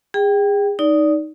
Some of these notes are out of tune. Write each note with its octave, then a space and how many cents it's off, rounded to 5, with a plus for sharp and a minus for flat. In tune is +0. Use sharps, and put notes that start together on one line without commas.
G#4 -30 G5 -5
D#4 +0 D5 -20